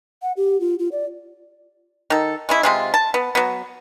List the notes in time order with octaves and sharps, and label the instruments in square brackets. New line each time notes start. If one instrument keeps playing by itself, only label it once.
[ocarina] F#5
G4
F4
F4
D5
[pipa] D#3 A4
G#3 C#4 E4
C3 G#3 F4
A5
B3
F#3 B3